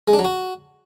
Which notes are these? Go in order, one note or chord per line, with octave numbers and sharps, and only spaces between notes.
G#3
D4
F#3
F#4